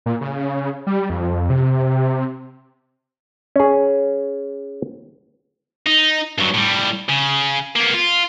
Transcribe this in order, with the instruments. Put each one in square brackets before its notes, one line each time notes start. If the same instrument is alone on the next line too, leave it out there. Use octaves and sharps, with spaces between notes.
[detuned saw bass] A#2
C#3
G3
F2
C3
[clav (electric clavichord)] C#4 G#4
[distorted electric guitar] D#4
G2 F#3
A2 G3
C#3
A#3 B3
F4